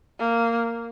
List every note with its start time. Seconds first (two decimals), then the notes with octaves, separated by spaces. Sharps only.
0.19 A#3